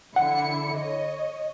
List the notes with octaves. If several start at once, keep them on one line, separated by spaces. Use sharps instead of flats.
D3 E4 F#5 C#7
C#5 D#5